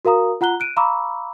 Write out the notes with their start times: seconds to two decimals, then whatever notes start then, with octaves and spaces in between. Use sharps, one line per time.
0.05 F#4 A#4 F5 A#5 D#6
0.41 F4 F#5 A#5 F#6 G7
0.60 F#6 D7 D#7
0.76 F5 A#5 B5 C#6 D6 E6